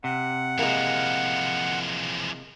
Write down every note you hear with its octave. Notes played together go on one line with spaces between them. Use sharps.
C3 F#5
E3 F3 G#3 A#3